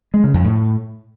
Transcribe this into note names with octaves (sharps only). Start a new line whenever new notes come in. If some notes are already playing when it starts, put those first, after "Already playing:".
G#3
C#3
F2
A2